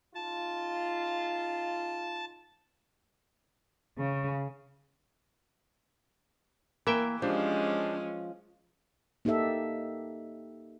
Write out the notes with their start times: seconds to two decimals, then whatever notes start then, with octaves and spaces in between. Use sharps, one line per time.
0.15 C#3 D#4 F4 A5
3.98 C#3
6.87 E3 A#3 A#4 E5 G5
7.22 F3 G#3 C#4 D4 G4 C5
9.25 A#3 D#4 G4 A4 E5